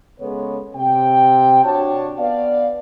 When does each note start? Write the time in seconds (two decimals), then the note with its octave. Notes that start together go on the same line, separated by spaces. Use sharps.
0.20 C#3 G#3 B3 A4 B4 C#5
0.76 C3 G5
1.64 D4 F#4 C#5 A5
2.19 B3 D5 F5